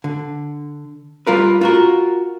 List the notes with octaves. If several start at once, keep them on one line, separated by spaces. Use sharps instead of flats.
D3
G3 F4 A#4 B4
F4 F#4 A#4